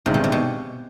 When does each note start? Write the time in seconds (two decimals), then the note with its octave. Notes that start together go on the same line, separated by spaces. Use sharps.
0.06 G1 G2 C3 D#3 G#3
0.14 B2
0.24 C3
0.32 B2